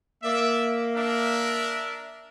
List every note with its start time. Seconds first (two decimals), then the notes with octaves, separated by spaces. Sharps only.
0.23 A#3 D5 E5
0.95 D4 A#4 E5